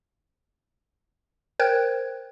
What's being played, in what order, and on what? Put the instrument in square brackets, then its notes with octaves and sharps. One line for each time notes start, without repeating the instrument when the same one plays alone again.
[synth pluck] A#4 C5 G5 F#6 G#6